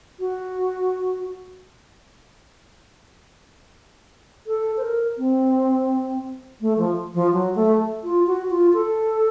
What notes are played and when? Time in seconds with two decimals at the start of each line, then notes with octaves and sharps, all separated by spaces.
0.20 F#4
4.47 A4
4.77 C5
4.82 A#4
5.18 C4
6.61 A3
6.78 F3
7.15 F3
7.32 F#3
7.55 A3
8.04 F4
8.27 F#4
8.51 F4
8.74 A4